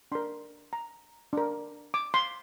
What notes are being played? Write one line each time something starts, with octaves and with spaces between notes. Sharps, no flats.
D4 A#4 C6
A#5
D4 A#4
D6
C6